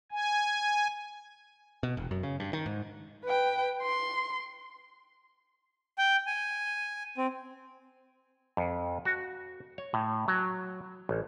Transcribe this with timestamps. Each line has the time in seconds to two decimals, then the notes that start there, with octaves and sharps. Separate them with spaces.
0.11 G#5
1.83 B2
1.97 E1
2.11 F#2
2.23 C#3
2.40 G2
2.53 D#3
2.66 G#2
3.25 B4 G5
3.82 C6
5.98 G5
6.27 G#5
7.17 C4
8.57 F2
9.05 F#4
9.78 C#5
9.94 A2
10.28 F#3
11.09 A1